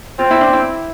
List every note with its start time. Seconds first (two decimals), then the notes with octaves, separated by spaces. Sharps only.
0.19 C4 F4
0.31 E4
0.41 D4
0.53 E4